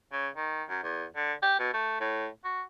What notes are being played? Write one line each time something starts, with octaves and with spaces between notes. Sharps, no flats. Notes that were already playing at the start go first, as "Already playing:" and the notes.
C#3
D#3
F#2
E2
D3
G4
B2
A3
A2
F#4